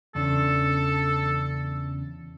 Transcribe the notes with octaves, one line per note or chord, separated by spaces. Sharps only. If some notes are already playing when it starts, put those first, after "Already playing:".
E2 C#3 D4 A4